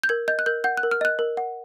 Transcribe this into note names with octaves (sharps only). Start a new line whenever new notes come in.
G6
A#4 G#6
D#5 G6
F#6
A#4 G6
F#5 G6
F#6
A#4
F6
D#5 F#6
A#4
F#5